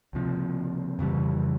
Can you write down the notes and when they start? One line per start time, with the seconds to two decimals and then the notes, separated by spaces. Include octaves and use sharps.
0.13 C#2 C3 F3
0.99 F2 C#3 E3 G3